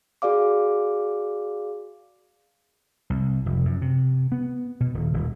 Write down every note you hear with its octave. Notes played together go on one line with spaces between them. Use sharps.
F#4 G#4 D5 F5 D6
C2
F1
F#2
C3
B3
B2
D#1
D#1